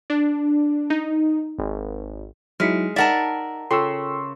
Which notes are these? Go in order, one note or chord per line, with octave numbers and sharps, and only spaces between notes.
D4
D#4
G#1
F#3 G#3 D#4 E4 F6 B6 C#7
D#4 A#4 D5 E5 F#5 A5
C#3 F4 A4 G5 C6 C#6 E6